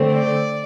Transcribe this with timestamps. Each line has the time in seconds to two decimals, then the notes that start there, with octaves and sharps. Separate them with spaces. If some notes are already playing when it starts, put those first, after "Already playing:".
Already playing: D3 A3 C4
0.12 D5